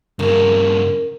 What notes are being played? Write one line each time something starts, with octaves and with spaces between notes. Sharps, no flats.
G2 C#3 A#4